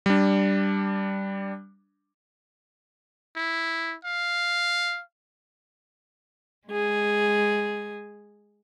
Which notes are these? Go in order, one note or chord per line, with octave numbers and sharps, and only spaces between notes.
G3 D4
E4
F5
G#3 G#4